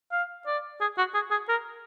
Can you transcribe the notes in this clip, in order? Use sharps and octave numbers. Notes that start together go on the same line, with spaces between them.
F5
D5
G#4
F#4
G#4
G#4
A#4